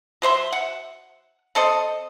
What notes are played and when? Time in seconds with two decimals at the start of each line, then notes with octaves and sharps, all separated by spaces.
0.22 F#3 C5 E5 C6
0.53 F#5
1.55 C4 A4 C5 D#5